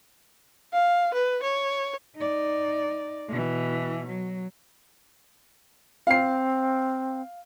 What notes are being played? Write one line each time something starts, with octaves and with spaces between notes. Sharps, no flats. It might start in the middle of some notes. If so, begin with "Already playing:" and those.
F5
B4
C#5
D#4 D5
B2 E3
F#3
C4 F5 C7